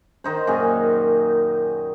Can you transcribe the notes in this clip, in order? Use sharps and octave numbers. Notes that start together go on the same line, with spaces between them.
D#3 D#4 C5
F#2 A#2 G#4 G#5